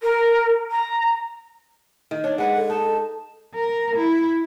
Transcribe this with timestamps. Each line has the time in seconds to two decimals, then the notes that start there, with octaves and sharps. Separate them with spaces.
0.01 A#4
0.71 A#5
2.11 D#3
2.24 D4 C#5
2.38 G#3 B4 F#5
2.56 A4
2.70 D#4 A5
3.54 A#4
3.96 E4